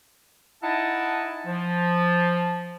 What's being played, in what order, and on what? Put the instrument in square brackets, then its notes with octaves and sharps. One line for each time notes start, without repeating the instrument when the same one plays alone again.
[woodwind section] D#4 E4 D#5 F#5 G#5 A5
F3